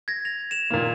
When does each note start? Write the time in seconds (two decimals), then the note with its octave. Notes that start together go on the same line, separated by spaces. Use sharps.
0.08 G#6 A#6
0.25 A#6 F7
0.51 E7 F7
0.70 A#2 D#3 A#3